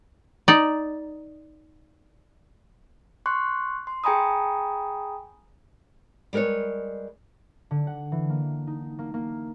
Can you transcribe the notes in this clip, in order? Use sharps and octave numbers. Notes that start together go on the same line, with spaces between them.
D#4 D5
C6 C#6 F#6
C6
G#4 G5 G#5 A#5 B5 D#6
G3 G#3 A#4 B4 C#5
D3
F#5
E3
A#3
D#4
A#3
A#3